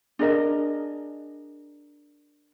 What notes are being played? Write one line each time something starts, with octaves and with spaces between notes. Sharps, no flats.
D4 G#4 A#4 D#5